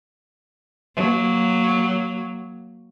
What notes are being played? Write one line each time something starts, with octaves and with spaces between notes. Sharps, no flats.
F#3 A#3